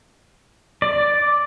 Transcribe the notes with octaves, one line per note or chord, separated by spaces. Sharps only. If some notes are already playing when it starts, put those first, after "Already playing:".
D5